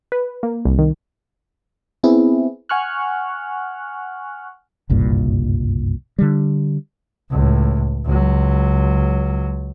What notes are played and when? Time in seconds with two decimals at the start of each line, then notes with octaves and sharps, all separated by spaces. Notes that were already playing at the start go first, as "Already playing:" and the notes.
0.12 B4
0.43 A#3
0.65 C2
0.79 D#3
2.03 B3 C4 E4 G#4
2.69 F#5 G#5 C#6 F6 F#6
4.90 F#1 C2 G2 A#2
6.19 D3 G3
7.31 C#2 A2
8.05 C#2 F#3